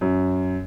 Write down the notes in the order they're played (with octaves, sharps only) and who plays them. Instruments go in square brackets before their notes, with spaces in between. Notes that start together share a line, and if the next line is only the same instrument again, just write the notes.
[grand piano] F#2